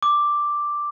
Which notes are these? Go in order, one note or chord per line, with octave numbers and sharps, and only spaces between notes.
D6